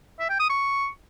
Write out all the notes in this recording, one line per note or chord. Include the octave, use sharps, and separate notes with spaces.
E5
G5
D#6
C#6